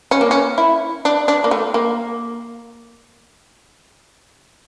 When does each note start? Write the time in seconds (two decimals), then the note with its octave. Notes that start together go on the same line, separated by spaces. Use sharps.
0.11 C#4
0.21 A#3
0.31 C#4
0.58 E4
1.05 D4
1.28 D4
1.44 A#3
1.51 A3
1.74 A#3